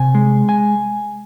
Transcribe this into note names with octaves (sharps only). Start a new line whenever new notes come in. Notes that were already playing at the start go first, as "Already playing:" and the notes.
Already playing: C3 G#5
G#3
G#5